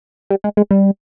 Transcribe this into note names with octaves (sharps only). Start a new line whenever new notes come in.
G3
G#3
G#3
G3